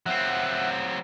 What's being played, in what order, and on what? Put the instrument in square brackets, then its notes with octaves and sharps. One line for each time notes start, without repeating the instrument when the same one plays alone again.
[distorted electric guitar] F#3 C4 [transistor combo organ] E5 F#5